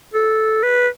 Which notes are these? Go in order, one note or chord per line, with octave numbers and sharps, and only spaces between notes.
A4
B4